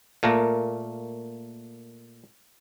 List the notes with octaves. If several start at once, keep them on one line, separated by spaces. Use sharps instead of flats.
A#2 A3 A#3 A#5